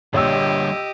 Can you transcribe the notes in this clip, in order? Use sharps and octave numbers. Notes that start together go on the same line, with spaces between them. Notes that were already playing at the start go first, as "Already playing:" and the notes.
A#1 D3 G3 G4 C#5 D#5 E6